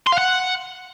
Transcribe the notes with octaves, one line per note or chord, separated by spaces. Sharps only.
C6
F5
F#5